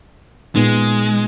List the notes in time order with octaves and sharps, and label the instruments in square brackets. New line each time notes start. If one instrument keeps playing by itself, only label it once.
[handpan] A#2 B3 D#4 [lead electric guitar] G#3